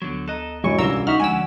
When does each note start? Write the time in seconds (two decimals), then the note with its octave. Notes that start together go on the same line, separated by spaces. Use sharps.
0.02 D2 D3 F#3 B3
0.28 A4 D#5 A#5 F#6
0.64 F#2 E3 G#3 D4 F#4 E5 C#6
0.78 C2 E3 C#4 F4 D5 A#5 E6
1.07 D#4 E5 F#5 C#6 D#6 F6
1.20 D3 F3 G#3 C#4 D5 F#5 G#5 E6